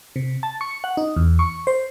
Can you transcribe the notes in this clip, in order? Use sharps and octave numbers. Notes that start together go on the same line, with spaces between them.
C3
A5
C#6
F#5
D#4
E2
C#6
C5